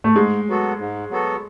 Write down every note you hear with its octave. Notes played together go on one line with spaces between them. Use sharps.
A3
G#2 G#3
F#3 B3 F#4 A4
G#2
F#3 B3 F#4 A4